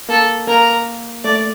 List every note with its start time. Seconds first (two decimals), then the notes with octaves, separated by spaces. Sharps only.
0.09 A#3 A4
0.47 A#3 A#4
1.24 A3 D5